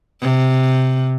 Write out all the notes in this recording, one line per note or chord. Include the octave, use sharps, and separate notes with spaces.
C3